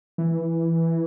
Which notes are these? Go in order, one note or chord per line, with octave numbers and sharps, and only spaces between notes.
E3